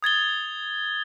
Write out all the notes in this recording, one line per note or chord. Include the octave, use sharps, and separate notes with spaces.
D#6 G#6 A6 G7